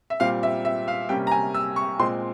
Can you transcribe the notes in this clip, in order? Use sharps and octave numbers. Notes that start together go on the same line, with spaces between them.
E5
A#2 G3 C4 F5
E5
E5
F5
C3 G3 A#3 C#4 G5
A#5
G#5
E6
C#6
A#2 G#3 C4 C6